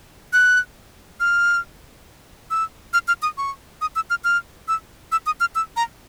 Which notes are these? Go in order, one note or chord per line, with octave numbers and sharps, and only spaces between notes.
F#6
F6
E6
F6
F6
D#6
C#6
D#6
E6
F6
F6
E6
E6
D#6
F6
E6
A#5